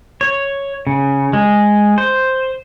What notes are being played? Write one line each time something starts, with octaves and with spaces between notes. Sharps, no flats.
C#5
C#3
G#3
C5